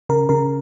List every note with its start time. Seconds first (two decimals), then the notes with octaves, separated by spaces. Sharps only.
0.09 C#3 A#4
0.29 C#3 A#4